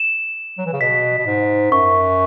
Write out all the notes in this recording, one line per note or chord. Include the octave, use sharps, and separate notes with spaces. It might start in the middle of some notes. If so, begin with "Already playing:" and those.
Already playing: E7
F#3
E3
C#3
B2 B6
B2
G#2
F#2 C#6